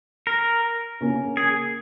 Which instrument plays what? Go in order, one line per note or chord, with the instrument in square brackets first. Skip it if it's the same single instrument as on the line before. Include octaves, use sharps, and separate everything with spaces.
[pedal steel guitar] A#4
[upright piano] C#3 A#3 C#4 A#4
[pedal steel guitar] G#4